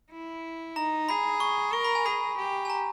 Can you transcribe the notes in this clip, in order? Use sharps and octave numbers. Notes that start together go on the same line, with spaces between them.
E4
D#4 A#5
G#4 B5
C#6
A#4 C#6
B5
G#5
G#4 B5
G4
G#5
A#5